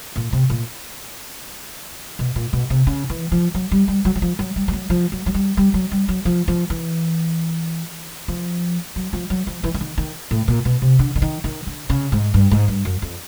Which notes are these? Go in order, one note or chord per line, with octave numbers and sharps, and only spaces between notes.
A#2
C3
A#2
B2
A#2
B2
C3
C#3
E3
F3
F#3
G3
G3
F#3
F#3
F3
F#3
G3
G3
F#3
F3
F#3
F#3
G3
G3
F#3
G3
F#3
F3
F3
E3
F3
F#3
F3
F#3
F3
E3
E3
D#3
D#3
A2
A#2
B2
C3
D3
D3
D#3
D#3
D3
C#3
G#2
G2
G#2
G2
F#2
F2